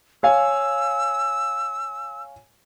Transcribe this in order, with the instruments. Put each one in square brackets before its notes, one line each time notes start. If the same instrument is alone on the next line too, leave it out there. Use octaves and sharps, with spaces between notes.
[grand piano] C#5 F5 G#5 [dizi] E6